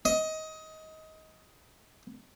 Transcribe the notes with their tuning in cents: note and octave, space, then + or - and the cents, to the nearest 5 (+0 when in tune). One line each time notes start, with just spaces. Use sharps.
D#5 +20